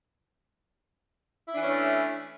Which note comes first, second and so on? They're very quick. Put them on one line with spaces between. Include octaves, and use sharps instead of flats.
E4 D4 E3 C#4 A3